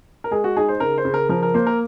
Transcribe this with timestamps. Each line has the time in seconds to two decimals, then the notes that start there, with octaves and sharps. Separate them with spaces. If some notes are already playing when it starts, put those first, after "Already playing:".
0.24 A#4
0.31 G#3 G#4
0.44 F#4
0.56 D#4 G#4
0.69 C5
0.80 C#3 A#4
0.98 C5
1.05 C#3
1.14 A#4
1.29 F3 A#4
1.43 A#4
1.54 A#3 C5
1.67 A#4